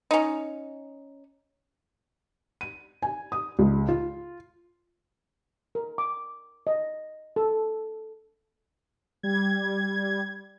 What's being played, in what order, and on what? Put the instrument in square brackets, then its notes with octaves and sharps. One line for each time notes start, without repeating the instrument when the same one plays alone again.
[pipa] C#4 D#4
[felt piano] D#7
G#5
D#6
C#2
F4
[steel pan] A#4
D6
D#5
A4
[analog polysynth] G3 G#6